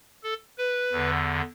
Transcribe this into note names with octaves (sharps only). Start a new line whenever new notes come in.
A4
B4
E2 D3